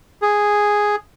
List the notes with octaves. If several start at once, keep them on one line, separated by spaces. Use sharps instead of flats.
G#4